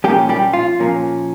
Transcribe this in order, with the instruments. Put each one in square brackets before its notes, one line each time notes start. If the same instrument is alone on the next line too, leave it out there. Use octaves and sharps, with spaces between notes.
[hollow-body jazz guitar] A#2 F3 G3 A#3 C#4 G4
G3 G4
F4
A#2 F3 A#3 C#4